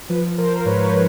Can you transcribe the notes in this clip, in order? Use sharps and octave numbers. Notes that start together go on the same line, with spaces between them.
F3 B4
F3 A#4 C5
G#2 B4 C#5